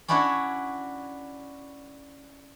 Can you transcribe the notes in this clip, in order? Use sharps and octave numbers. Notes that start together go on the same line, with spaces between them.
C#4 D4 E4 F#4 C#5